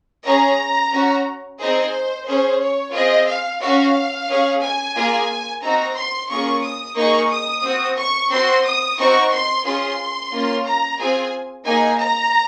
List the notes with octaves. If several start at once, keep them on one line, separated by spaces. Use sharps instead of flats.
C#4 G#4 A#5
C#4 F#4
C4 D#4 G#4 C5
C#4 G#4 C5
C#5
C4 F4 G#4 D#5
F5
C#4 F#4 F5
C#4 G#4
G#5
A#3 F4 G#4
C4 D#4 F#4 A#5
C6
A#3 C#4 F4 G#4 C#6
D#6
A#3 D#4 G#4 C#6
D#6
C4 F#4
C#6
C4 F#4 C6
D#6
C4 D#4 F#4 C#6
C6
C#4 F4 G#4 C6
A#3 C#4 F4
A#5
C4 F4 G#4 G#5
A#3 D#4 G#4 G#5
A#5